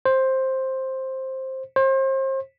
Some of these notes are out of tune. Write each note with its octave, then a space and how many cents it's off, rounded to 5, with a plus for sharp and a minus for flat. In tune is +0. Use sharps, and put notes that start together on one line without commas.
C5 +10
C5 +35